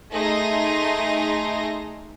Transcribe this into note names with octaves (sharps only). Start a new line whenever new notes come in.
A3 D#4 G#4 A#5 C6 A#6